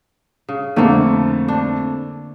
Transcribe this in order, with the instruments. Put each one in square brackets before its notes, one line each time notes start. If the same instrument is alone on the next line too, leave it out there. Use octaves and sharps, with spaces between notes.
[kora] C#3
[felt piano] F2 A3 [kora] D3 A#3
[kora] D4